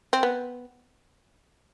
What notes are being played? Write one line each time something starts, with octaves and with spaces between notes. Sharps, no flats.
C4
B3